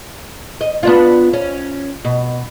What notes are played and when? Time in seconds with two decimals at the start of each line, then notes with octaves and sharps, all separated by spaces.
0.61 D#5
0.83 B3 D4 F4
1.33 C#4
2.05 B2